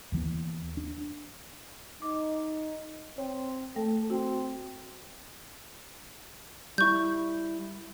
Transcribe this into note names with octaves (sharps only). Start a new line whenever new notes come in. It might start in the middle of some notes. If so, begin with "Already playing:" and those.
D#2 E3 B3
D4
D#4 D6
C4 C#5
A3 A4
C4 F#4
G3 E4 C#6 G6